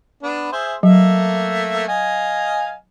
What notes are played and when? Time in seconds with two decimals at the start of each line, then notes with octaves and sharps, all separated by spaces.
0.23 B3 D4
0.52 G#4 C5 E5
0.83 F#3 A3 A#3 E5
1.88 D#5 F5 G#5